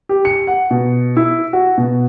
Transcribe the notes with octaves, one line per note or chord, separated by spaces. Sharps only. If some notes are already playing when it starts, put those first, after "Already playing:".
G4
C#7
F#5
B2
E4
F#4
B2